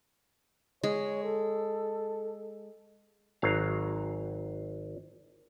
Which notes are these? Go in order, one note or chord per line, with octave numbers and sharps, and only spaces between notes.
G#3 C#5
A4
G#1 F#3 F5